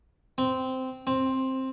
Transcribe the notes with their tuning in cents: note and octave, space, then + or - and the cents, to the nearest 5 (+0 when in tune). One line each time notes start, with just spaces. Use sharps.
C4 -10
C4 +10